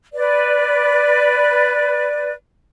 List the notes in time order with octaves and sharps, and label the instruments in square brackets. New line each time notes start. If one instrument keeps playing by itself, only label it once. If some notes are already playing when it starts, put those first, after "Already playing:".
[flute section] B4 D5